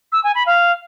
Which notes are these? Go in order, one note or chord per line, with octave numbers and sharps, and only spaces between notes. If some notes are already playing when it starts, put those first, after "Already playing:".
E6
G#5
B5
F5